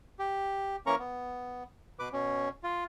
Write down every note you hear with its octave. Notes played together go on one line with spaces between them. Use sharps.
G4
E3 A#3 C#4 A#4 A#5 C#6
B3
B2 B4 D6
B2 C#4
F4